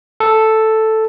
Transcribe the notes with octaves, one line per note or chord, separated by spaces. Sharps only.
A4